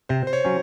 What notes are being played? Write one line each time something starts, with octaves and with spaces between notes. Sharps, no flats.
C3 C5
C5
C#5
F#3 C#4